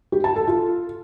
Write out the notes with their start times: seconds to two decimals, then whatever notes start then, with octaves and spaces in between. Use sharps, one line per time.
0.12 G4
0.24 A5
0.36 A4
0.48 F4